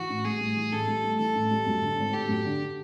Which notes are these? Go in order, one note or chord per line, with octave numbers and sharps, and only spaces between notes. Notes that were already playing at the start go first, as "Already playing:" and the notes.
Already playing: E3 F#4
A1
G3 G#4
A2
E3
A1 A4
G3
A2
E3 A4
A1
G3
F#2
D3
G#1
G#1 G4
F#2
D3